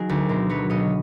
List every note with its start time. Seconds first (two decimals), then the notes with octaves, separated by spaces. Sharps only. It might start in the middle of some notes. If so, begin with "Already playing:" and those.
Already playing: D#3 F#3 G#4 A#4
0.09 D2
0.29 B2 A#4 C5
0.49 F#3 B4 C#5
0.70 B1 C#5 D#5